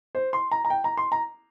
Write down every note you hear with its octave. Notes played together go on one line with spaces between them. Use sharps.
C5
C6
A#5
A#5
G5
A#5
C6
A#5